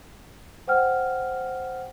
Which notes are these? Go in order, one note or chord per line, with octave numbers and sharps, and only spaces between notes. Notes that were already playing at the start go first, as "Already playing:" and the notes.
C5 F#5 G5 F6